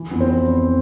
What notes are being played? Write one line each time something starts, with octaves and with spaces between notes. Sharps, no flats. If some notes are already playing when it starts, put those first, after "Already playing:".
Already playing: E3
F2 B3
C4